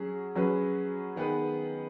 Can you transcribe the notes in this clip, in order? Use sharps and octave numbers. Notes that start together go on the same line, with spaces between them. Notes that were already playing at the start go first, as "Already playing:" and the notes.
Already playing: F#3 C#4 G#4
F#3 C#4 G#4 B4
D#3 B3 G#4 B4